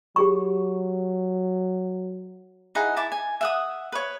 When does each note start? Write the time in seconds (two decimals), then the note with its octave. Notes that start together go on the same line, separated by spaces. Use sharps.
0.16 F#3 G4 G#4 C#6
2.75 D#4 E4 G#4 F#5
2.96 E4 A5 D6
3.12 G#5
3.41 E5 F#5 D#6
3.92 B4 C#5